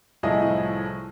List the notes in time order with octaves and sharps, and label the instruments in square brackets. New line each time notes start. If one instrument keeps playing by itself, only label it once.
[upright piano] C2 A2 F3 E4 G#4 D#5